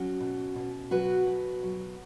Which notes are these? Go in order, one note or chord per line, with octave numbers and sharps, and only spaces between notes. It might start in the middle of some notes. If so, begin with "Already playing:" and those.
Already playing: F#3 C#4 F#4
B2
B2
F#3 F#4 B4
B2
F#3